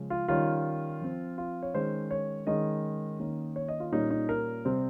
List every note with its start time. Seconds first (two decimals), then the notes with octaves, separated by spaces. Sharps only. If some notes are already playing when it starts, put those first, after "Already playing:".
Already playing: C#3 F3 G#3 C#4
0.10 F4
0.28 D#3 G3 C#4 F4
1.01 F3 C4
1.38 F4
1.62 C#5
1.74 D#3 G#3 C#4 C5
2.11 C#5
2.47 D#3 G#3 C#4 D#5
3.20 D#3 A#3 C#4
3.56 C#5
3.68 D#5
3.80 F4
3.92 A#2 G3 C#4 D#4
4.11 D#4
4.29 A#4
4.65 C3 G3 C4 C5